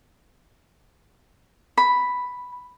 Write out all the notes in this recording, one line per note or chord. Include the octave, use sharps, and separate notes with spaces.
B5